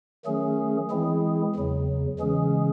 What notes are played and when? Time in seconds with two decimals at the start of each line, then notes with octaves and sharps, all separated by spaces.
0.26 D#3 F#3 A3 C#4 G#4
0.90 E3 G#3 C4 E4 G#4
1.55 E2 C#3 F#3
2.19 C#3 E3 G#3 C#4 G#4